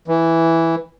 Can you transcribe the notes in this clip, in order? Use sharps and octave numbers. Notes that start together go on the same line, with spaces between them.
E3